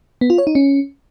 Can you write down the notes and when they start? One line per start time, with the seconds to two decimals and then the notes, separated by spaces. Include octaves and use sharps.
0.21 B3
0.30 F4
0.38 C#5
0.47 D#4
0.55 C#4